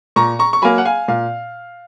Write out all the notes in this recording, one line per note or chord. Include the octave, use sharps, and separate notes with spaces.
A#2 A#5 C#6
A#5 C#6
C#6
F#3 A#3 G#5 B5
F#5
F5 G#5
A#2 F5